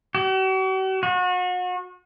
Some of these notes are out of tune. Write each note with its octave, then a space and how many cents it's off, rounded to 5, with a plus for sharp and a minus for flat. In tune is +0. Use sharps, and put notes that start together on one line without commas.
F#4 +45
F#4 -35